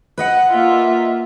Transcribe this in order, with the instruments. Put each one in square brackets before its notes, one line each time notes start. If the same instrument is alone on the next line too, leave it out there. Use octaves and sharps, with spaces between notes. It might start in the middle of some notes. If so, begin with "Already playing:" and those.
[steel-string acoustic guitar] B4 D#5 F#5
[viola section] A#3 F4 E5